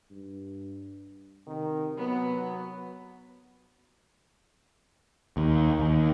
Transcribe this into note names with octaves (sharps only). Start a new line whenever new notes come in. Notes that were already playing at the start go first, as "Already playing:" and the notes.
G2
C3 D#3
F#3 B3
D#2
D#2